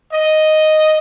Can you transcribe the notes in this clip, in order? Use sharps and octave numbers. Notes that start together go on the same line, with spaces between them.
D#5